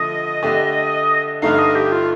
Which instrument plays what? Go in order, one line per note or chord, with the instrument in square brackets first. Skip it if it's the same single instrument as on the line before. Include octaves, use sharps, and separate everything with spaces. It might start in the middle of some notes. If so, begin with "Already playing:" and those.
Already playing: [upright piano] D3 F3 A3 [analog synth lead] D#5
[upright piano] D3 A3 D4 G4
[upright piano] G2 D3 A3 D#4 [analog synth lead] F5
[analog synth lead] D#5
G4
F4